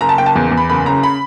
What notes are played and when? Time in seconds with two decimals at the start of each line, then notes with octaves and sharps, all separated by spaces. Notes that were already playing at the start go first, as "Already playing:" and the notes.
0.01 F#1 A#5
0.09 A5
0.18 F#1 G5
0.26 A5
0.36 E2
0.51 E2
0.57 B5
0.69 F#1 B5
0.86 C#3 A#5
1.03 B5